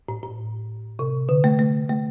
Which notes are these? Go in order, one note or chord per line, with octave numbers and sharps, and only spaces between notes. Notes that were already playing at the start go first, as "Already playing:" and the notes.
A2
A2
C3
D3
A3
A3
A3